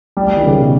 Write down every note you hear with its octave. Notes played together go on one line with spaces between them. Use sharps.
G3
G3
D#3
C#3
B2